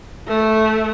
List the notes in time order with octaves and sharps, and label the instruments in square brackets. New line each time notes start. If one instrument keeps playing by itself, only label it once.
[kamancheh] A3